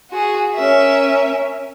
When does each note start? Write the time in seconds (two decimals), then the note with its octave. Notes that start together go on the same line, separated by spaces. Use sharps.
0.10 F#4 G#4
0.54 C#4 A#4 E5